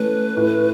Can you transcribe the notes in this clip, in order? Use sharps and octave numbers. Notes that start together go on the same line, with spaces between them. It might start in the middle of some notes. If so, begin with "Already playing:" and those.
Already playing: E3 A3 C#4 B4
A2